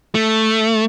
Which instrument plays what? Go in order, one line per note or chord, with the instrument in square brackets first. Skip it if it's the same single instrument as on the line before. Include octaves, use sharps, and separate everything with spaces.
[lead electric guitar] A3